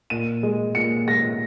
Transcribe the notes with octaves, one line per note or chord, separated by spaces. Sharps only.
A#2 D#7
G#3
A#2 C#7
G#3 A#6